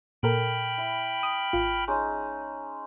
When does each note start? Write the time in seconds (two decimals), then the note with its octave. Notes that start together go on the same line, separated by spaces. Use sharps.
0.23 A#2 A4 A#4 G5 B5 F6
0.78 E4
1.23 D#6
1.53 G#1 F4
1.88 G#3 C#4 D#4